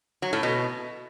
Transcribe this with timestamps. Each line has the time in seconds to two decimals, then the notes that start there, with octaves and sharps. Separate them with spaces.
0.22 F#3
0.33 A2
0.43 B2